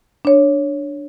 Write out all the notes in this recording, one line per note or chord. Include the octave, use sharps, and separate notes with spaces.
D4 C#5